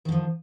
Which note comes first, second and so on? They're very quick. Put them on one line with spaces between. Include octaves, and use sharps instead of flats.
D#3 D3 F3